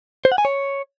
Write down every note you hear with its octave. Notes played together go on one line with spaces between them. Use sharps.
C5
F#5
G#5
C#5